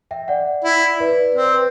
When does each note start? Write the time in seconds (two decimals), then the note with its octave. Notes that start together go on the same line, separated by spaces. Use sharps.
0.11 E5 G5
0.28 D5 F#5
0.64 E4
1.00 B4 D5
1.35 C4 C5
1.45 C5
1.54 B4